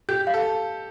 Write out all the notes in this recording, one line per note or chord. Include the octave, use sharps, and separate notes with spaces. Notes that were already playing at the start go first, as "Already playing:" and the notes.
G4 G6
F5
A4